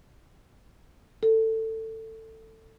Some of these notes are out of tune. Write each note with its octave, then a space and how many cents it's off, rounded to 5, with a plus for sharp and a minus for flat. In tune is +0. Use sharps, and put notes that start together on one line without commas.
A4 +20